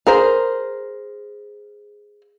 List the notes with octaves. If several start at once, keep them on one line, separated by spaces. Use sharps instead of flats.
G#4 A#4 C5